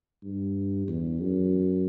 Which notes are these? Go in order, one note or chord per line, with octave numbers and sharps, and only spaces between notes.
G2
E2
F#2